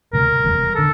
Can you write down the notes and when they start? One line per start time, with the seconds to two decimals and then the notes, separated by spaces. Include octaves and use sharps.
0.13 D2 C3 G3 A#4
0.44 F1 E2 C3 G3
0.75 D3 A4